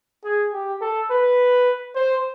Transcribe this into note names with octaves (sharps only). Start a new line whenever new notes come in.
G#4
G4
A4
B4
C5